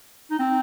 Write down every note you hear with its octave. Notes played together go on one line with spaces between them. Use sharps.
D#4
C4